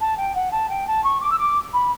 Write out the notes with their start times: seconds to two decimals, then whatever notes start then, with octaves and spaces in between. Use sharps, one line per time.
0.01 A5
0.17 G5
0.35 F#5
0.51 A5
0.69 G5
0.87 A5
1.04 C#6
1.21 D6
1.30 E6
1.38 D6
1.73 B5